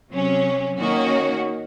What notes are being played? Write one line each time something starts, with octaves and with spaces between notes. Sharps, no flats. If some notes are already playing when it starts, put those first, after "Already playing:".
C3 F#3 C#4
D#3 A#3 C#4 F#4